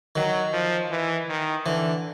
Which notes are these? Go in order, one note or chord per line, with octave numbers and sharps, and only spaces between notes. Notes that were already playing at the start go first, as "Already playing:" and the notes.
D#3 F#3
F3
E3
D#3
D3 E3